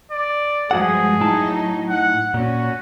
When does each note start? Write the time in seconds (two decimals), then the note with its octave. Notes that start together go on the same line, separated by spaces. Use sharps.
0.11 D5
0.71 G2 F3 G#3 F#4 G#4 F#5
1.21 A2 F#3 D#4 E4 A5
1.89 F#5
2.34 A#2 C#4 F#4